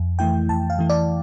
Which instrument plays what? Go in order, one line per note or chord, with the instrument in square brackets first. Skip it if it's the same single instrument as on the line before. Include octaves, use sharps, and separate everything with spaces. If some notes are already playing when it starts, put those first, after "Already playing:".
Already playing: [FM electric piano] F2
E3 A3 E4 G5
F2 A5
F5
E3 A3 E4
D5